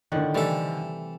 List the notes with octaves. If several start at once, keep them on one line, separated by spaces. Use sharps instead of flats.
A2 D3 D#3 D5 F#5
C3 E3 G3 A3 A4